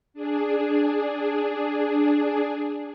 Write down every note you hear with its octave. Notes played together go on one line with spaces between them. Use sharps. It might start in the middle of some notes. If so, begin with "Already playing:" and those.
D4 G#4